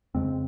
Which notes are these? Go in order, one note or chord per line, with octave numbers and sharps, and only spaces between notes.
F2 C#3 G#3 C4